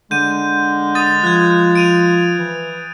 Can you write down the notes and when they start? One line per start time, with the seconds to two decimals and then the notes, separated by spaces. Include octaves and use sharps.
0.11 D3 G#3 G6 D#7
0.95 D#6 A6 D#7
1.24 F3 F#6 G#6
1.75 D7 D#7 F7
2.39 E3